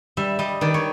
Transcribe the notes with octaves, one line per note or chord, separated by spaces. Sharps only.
G3 E5
G3 D#5
D#3 D5
C#5